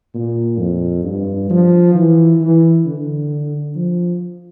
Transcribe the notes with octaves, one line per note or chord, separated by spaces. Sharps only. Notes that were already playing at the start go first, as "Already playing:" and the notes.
A#2
F2
G2
F3
E3
E3
D3
F3